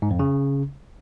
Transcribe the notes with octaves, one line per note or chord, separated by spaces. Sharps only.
G#2
F2
C#3